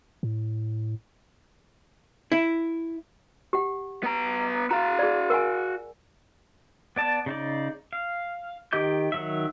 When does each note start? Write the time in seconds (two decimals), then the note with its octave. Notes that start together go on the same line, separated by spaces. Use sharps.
0.23 A2
2.32 E4
3.53 G4 F#5
4.03 B3 A#5
4.71 F#4 F5 A#5
4.99 G#4 D5
5.30 A#4 F#5 G#5
6.96 B3 D5 A5
7.26 C#3 D#4 D5
7.93 F5
8.73 D#3 G4 D#5 D6 G6
9.12 D#3 F#3 E5